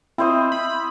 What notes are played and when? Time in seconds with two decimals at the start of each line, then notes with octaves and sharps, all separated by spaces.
0.18 C4 E4 C5 D#5
0.52 B5